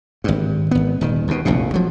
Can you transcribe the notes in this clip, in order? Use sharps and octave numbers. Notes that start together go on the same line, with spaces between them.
G#1 G2
G#1 B3
D#1 D#3
D#2 B2
F1 A#1 D#2 B2
F3 F#3